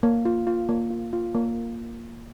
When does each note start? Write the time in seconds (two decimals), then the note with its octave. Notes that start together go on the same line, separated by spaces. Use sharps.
0.03 A#3
0.25 F4
0.47 F4
0.69 A#3
0.90 F4
1.13 F4
1.35 A#3